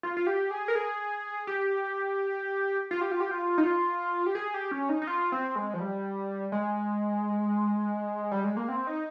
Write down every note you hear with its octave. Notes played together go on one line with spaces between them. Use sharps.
F4
F4
G4
G#4
A#4
G#4
G4
F4
G4
F4
G4
F4
D#4
F4
G4
G#4
G4
C#4
D#4
D#4
F4
C4
G#3
F3
G3
G#3
G3
G#3
A#3
C4
D#4